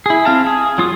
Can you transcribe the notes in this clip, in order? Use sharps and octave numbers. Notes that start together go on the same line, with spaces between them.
E4 G#4
C4 F5 A5
G#4
F#3 F4 D#6